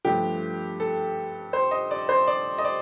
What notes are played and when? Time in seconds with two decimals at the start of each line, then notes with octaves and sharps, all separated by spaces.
0.05 G2 F3 A3 G4
0.80 A4
1.53 C5
1.71 D#5
1.91 D5
2.09 C5
2.27 D5
2.58 D#5
2.65 D5